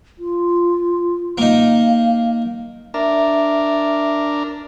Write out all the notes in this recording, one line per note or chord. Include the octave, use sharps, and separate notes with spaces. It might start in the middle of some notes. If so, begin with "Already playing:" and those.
F4
A#3 D#4 F5
D4 A#4 E5